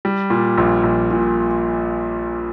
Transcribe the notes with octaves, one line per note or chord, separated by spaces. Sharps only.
G3
A#2
A#1
A#1
A#2